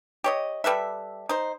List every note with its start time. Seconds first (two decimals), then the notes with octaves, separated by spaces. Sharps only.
0.24 G4 C#5 D#5
0.64 G3 A4 B4 E5
1.29 D#4 C5